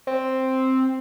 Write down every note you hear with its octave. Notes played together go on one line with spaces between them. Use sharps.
C4